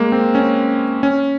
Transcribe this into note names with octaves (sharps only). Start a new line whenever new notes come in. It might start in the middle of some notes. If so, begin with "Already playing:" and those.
Already playing: G#3 A#3
C4
C#4
C#4